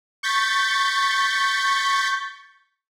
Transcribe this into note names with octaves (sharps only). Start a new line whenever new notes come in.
C#6 G6 A6 B6